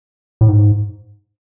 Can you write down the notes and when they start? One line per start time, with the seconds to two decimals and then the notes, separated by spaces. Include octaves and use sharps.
0.41 A2
0.48 G#2